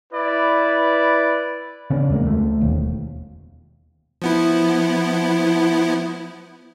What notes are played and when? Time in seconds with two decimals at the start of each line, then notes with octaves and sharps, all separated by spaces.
0.12 E4 B4 D5
1.90 C#3 B3 C#4 D4
2.10 E2 G#3 A#3
2.24 D2 A3
2.61 E1 D#2
4.22 F3 B3 E4